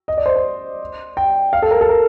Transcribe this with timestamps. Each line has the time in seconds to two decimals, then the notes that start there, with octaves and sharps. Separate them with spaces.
0.08 D#5
0.17 D5
0.26 C5
0.36 C5
1.17 G5
1.53 F5
1.62 A4
1.71 A#4
1.81 A4
1.89 A#4